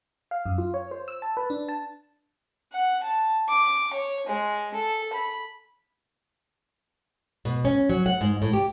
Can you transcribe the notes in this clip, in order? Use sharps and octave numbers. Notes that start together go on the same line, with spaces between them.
F5
F#2
F4
C#5
C5
E6
A5
B4
D4
A5
F#5
A5
D6
C#5
G#3
A4
B5
B2
C#4
F#3
F#5
G#2
A2
G4